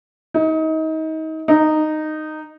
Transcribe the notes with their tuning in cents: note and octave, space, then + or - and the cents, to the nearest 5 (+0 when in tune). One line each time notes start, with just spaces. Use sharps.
D#4 +30
D#4 -10